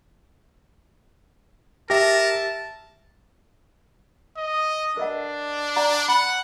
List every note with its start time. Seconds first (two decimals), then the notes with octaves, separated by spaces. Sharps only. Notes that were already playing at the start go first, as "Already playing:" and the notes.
1.90 G4 A#4 E5 A5 A#6
4.37 D#5
4.97 D4 A#4 D#5 F#5
5.76 D5 F#5 A#5
6.08 F#5 B5